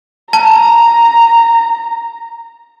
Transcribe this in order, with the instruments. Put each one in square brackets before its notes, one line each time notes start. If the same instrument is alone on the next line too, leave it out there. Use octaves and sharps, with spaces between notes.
[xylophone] A5 [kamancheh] A#5